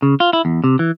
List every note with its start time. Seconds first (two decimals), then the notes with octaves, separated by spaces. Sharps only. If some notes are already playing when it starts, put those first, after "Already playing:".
0.02 C#3
0.20 F4
0.33 E4
0.45 E2
0.64 C3
0.79 E3